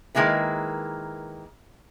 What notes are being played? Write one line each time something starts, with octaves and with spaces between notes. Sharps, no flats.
D#3 G#3 A#3 E4 B4